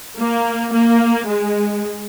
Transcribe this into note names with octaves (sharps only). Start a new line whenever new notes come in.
A#3
A#3
G#3